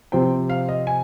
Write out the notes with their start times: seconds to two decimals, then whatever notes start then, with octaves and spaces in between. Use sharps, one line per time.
0.12 C3 F3 C4 G5
0.50 F5
0.69 D#5
0.87 G#5